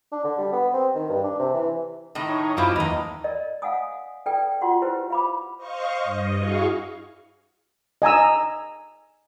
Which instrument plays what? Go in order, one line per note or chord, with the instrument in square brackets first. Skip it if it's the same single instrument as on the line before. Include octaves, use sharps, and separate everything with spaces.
[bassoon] D4
D3
G3
B3
C4
D#3
G2
D4
C3
E3
[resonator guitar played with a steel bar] A2 D#3
[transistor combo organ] D#4 C#5
[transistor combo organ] F#2 D#5 D6 [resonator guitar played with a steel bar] E4 F4 C5
[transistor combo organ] D#2 E3 [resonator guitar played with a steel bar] A2 D#4
[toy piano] A#4 D5 D#5
F5 F#5 G#5 D#6
D4 A4 B4 D5 G5
F4 F#4 F#5 C6 C#6
E4 G4 B4 C5
F5 B5 D6
[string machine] C5 D#5 F5 C#6
G2 D#5
E4 F#4 G#4 F5 C#6
[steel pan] D#5 G#5 A#5 E6